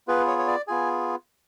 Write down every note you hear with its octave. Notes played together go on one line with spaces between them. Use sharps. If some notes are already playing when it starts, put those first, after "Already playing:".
B3 F4 G#4 B4
C#5
C#5
D5
B3 F4 G#4 G#5